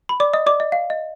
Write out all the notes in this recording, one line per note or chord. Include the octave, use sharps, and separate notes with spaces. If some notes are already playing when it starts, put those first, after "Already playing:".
B5
D5 D6
D#5 D#6
D5 D6
D#5
F5
D#5